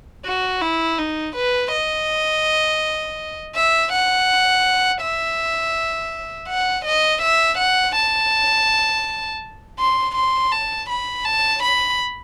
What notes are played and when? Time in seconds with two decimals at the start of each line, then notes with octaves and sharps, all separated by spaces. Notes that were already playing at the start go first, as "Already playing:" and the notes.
0.26 F#4
0.62 E4
0.98 D#4
1.36 B4
1.72 D#5
3.55 E5
3.92 F#5
5.01 E5
6.48 F#5
6.85 D#5
7.22 E5
7.58 F#5
7.95 A5
9.79 C6
10.15 C6
10.52 A5
10.89 B5
11.25 A5
11.63 B5